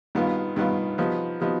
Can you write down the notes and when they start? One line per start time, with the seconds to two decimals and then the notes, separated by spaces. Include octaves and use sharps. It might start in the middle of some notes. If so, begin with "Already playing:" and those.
0.15 G2 D#3 B3 F4
0.56 G2 D#3 B3 F4
0.98 C3 F3 B3 D#4
1.40 C3 F3 B3 D#4